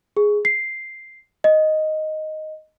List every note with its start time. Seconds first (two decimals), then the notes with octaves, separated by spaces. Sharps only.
0.17 G#4
0.45 C7
1.44 D#5